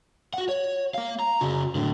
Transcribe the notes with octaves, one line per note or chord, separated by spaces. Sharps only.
F#4 F#5
C#5
A#3 F5
A#5
C#3 F#4
A2 D3